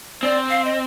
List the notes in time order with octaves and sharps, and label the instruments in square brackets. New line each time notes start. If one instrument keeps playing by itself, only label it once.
[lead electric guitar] C4 [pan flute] D5
[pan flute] F5
D#5